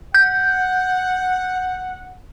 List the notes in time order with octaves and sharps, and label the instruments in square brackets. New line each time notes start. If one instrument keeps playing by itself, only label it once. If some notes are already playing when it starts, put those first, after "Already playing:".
[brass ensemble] F#5 [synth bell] G6